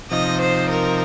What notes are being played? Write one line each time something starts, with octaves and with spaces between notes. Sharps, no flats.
C3 F3 D#4 D#5
C5
A#4